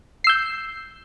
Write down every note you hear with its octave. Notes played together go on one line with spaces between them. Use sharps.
E6 G6 C7